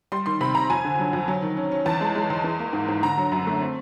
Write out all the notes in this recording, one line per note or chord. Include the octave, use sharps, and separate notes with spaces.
G3 C6
D#3 C6
C3 B5
C3 A#5
F2 G#5
D3
F#3
F2
F#3
D#3
C#4
C#4
E2 A5
G#3
G#3
E2
E3
A#3
G#2
G#2
D3 A#5
F#3
F#2
A3
C4